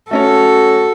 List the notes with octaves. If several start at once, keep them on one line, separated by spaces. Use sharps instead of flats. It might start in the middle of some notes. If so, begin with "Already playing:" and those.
A3 C#4 F#4 A4 C#5